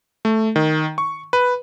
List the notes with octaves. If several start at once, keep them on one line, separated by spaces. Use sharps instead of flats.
A3
D#3
C#6
B4